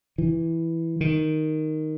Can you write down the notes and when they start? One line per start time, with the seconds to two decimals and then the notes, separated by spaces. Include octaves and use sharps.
0.18 E3
1.01 D#3